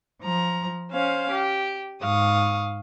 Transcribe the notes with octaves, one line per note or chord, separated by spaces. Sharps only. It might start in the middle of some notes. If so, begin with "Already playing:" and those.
F3 A#5
C#4 C5 F5
G4
G#2 F5 C#6 D#6